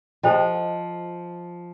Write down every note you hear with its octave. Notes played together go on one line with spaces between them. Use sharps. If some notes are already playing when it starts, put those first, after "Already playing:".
F3 A4 C5 D#5 G5